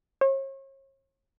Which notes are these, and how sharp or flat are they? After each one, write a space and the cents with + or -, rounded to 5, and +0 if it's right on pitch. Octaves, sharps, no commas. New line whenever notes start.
C#5 -40